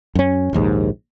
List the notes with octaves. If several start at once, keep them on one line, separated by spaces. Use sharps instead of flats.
F#2 C#4
A#1 D#2 G#2